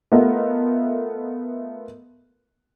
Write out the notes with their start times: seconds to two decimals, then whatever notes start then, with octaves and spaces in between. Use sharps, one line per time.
0.12 A3 B3 F4 A#4 D#5